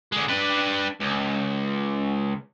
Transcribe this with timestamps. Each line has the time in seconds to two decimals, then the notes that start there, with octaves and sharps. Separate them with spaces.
0.12 D3 G#3
0.28 D4 B4
1.00 C#2